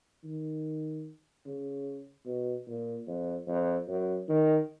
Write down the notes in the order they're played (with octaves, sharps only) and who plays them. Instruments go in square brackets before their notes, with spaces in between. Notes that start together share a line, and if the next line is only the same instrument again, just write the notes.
[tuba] D#3
C#3
B2
A#2
F2
F2
F#2
D#3